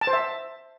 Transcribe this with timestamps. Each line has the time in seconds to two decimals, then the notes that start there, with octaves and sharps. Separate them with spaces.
0.01 A5
0.07 C5
0.13 E5